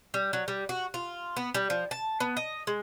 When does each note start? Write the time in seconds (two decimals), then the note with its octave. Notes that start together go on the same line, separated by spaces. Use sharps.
0.14 G3
0.33 F#3
0.48 G3
0.69 F#4
0.94 F4
1.37 B3
1.54 G3
1.70 F3
1.91 A5
2.20 B3
2.37 D#5
2.67 G#3